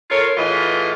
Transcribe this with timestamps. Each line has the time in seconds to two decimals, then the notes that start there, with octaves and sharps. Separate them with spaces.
0.10 F4 A4 A#4 C#5
0.37 A2 E3 F4 G#4 D#5